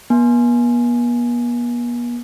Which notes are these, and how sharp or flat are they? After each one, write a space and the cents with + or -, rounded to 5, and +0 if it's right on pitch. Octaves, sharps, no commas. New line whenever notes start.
B3 -45 G#5 +15